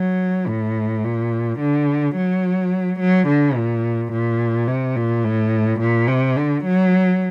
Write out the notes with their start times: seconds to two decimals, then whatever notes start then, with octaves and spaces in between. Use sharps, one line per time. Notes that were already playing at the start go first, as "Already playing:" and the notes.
Already playing: F#3
0.48 A2
1.04 A#2
1.60 D3
2.16 F#3
3.00 F#3
3.28 D3
3.56 A#2
4.13 A#2
4.68 C3
4.96 A#2
5.24 A2
5.80 A#2
6.08 C3
6.36 D3
6.64 F#3